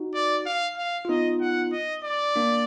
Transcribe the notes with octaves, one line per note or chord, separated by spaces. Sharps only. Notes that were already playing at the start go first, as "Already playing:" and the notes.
Already playing: D#4 F#4
D5
F5
F5
F4
B3 D#4 D#5
F#5
D#5
D5
A#3 D4